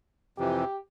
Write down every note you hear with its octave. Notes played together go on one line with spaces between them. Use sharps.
F2 C3 E3 G4